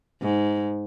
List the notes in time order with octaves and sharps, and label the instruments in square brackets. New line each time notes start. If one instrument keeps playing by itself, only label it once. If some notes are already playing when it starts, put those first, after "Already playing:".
[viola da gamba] G#2